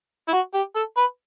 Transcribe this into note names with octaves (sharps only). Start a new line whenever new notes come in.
E4
F#4
G4
A4
B4